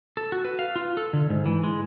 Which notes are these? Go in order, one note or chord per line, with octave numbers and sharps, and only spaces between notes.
A4
F#4
B4
F5
F4
A4
D3
G#2
E3
G#3